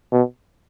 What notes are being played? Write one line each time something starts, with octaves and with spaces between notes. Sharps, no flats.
B2